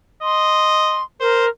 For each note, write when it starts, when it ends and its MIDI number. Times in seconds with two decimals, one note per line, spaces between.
0.23 1.02 75
0.23 1.02 84
1.20 1.48 70
1.20 1.46 72